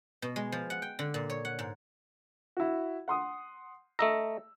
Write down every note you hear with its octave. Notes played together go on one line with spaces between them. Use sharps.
B2
G#3
F3
F#5
G5
D3
A#2
C#5
F#5
G#2
E4 F#4
F#5 C6 D#6
A3 D#5 A#5 E6